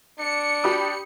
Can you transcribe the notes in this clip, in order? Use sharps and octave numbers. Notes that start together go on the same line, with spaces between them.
D4 C#7
G4 B5 D#6